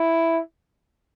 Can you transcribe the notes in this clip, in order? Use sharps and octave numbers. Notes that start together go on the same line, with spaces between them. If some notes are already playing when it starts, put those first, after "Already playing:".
Already playing: E4